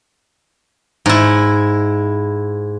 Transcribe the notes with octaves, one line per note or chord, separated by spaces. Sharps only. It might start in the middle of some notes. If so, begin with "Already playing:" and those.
G#2 E4